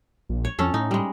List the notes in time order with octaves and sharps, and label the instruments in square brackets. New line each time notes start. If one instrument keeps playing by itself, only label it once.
[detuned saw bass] A#1
[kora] C#5
[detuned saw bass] F2 [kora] C#4 A4
[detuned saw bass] A2 [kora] D#4
[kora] G3 G#3